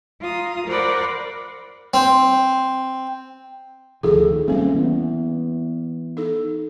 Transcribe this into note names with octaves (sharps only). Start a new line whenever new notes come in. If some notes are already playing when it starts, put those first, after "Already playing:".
F4 A#5 D#6
A#4 C5 D5 F#5 B5
C4
D2 D#3 F3 G#4 A4
G3 A#3 C4 C#4
E3 B3
D#4 A4